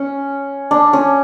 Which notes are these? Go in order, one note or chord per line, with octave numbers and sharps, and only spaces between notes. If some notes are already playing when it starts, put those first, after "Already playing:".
Already playing: C#4
D4
C#4